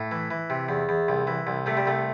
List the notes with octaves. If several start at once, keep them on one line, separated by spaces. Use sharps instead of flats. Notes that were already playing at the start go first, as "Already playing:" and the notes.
Already playing: A2
E3
E3
C3
E2
E2
C2
E3
C2
C3 A3
G3
C2 A3